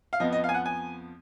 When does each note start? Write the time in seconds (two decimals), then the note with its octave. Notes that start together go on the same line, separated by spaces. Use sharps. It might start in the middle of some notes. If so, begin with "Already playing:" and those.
0.13 F5
0.20 F2 F3 B3 D#5
0.32 D#5
0.44 F5
0.49 G#5
0.54 F#5
0.66 G#5